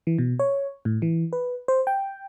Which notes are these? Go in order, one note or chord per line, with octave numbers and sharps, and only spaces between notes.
E3
B2
C#5
A2
E3
B4
C5
G5